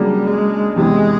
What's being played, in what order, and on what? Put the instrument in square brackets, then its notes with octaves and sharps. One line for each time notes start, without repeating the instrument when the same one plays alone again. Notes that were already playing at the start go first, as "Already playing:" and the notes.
Already playing: [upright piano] C#3 F#3 A#3 D4 [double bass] G3
[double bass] G#3
[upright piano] E2 C3 E3 [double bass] G#3